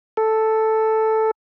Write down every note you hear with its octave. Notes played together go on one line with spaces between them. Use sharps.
A4